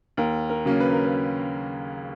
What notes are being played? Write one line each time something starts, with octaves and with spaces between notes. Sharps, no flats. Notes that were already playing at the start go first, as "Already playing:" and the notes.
D#2 A#4
A#4
C#3 F#3 A#3 C#4
B4
A#4
B4